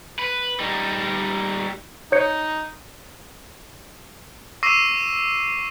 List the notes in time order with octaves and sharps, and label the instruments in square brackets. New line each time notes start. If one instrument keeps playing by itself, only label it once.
[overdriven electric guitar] B4
G3 D#4
[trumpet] D#4 [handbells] C#5 G6 C#7
[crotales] C#6 D6 E6 A#6 C7 D#7